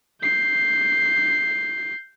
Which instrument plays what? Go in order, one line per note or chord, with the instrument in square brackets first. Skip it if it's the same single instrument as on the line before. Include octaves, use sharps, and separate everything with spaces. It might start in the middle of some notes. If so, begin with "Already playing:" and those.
[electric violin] G6 C7